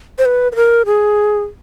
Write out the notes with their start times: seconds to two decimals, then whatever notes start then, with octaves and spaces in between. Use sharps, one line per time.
0.18 C5
0.25 B4
0.52 B4
0.55 A#4
0.86 G#4